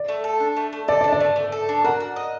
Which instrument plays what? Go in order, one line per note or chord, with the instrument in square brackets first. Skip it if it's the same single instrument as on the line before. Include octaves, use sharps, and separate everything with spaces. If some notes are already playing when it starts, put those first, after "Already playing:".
Already playing: [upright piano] D5
[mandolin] A3
A4
D4
A3
A3
[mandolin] A4 [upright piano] D5
[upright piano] D5
[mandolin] D4
[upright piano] D5
[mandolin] A3
A3
A4
D4
[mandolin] F#4 [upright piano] A#4
[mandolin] F#4
D#5